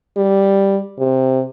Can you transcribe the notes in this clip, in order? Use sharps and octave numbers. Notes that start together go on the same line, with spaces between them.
G3
C3